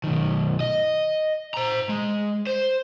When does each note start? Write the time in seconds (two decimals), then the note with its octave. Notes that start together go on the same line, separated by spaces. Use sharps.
0.04 B1 D#3
0.60 D#5
1.54 C5 A#5
1.89 G#3
2.47 C5